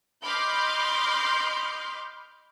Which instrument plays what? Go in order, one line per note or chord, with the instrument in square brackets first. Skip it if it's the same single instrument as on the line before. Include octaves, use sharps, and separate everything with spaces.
[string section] D#5 B5 C6 D6 F6 G6